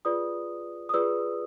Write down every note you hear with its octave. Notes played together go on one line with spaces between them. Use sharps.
F4 G#4 B4 D5 D#6
D#6
F4 G#4 B4 D5 E6